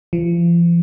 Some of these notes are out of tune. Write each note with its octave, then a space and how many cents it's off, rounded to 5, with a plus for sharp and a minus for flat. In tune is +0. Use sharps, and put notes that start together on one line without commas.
F3 -40